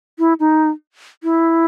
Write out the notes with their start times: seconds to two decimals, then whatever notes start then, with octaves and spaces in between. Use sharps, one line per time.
0.19 E4
0.40 D#4
1.23 E4